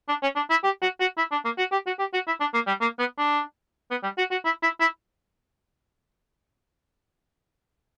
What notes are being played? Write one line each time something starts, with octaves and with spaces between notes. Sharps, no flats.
D4
C#4
D4
E4
G4
F#4
F#4
E4
D4
A#3
F#4
G4
F#4
G4
F#4
E4
D4
A#3
G3
A#3
B3
D4
B3
G3
F#4
F#4
E4
E4
E4